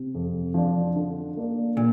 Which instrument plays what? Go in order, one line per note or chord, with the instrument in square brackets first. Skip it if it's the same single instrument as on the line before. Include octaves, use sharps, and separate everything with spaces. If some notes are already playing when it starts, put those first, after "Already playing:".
Already playing: [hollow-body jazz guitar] C3
[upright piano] F2
F3 D4
D3
A#3 D4
[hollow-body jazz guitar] A#2 [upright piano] D3